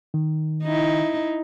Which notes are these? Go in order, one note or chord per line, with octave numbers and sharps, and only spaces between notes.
D#3
D#4 E4